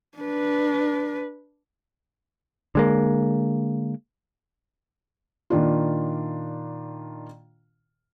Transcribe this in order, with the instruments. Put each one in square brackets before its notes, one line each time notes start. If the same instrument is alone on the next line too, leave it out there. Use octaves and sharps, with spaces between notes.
[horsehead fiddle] D4 B4
[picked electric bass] D3 G#3 A#3
[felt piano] A#2 D#3 D4 F4